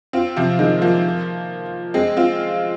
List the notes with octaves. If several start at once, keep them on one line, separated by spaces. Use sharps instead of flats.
C4 F4
C3 F3
D#3 G#3
F3 A#3
G#3 C4
C4 F4